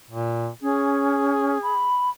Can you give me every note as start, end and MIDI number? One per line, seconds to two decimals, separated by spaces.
0.10 0.48 46
0.62 1.58 61
0.62 1.89 68
1.63 2.10 83